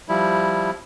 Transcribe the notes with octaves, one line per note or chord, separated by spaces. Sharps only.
F3 G3 E4